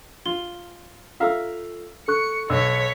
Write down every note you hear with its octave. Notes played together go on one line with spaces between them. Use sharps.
F4 G7
F4 A4 E5 F5 A#5 E6
A4 C#6 F#6 C#7
B1 C#5 E6 B6